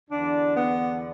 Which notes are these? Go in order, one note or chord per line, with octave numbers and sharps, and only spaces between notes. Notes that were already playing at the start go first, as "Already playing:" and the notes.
E2 D3 D4
B3